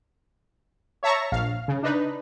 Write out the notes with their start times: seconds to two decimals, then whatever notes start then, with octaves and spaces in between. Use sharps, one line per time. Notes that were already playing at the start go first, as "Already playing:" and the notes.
1.03 C#5 E5 A5 A#5 C#6
1.32 A#1 F5
1.68 C#3
1.83 D4 D#4 B4